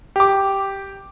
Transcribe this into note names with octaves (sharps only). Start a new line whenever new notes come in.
G4 D6